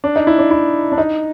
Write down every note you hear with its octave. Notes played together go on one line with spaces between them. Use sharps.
D4
D#4
E4
D4
E4
D4
D#4